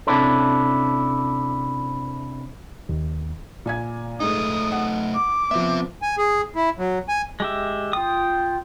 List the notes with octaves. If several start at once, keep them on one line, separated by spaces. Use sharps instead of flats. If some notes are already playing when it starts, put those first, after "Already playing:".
C3 C#4 D4 E4 A4
D#2
A#2 G#5 G#6
G#2 A3 D#4 D#6
F#5
D6
F3 B3 C4 E5
G#5
G#4
E4
F#3
G#5
G#3 G4 E5
F4 G5 D#6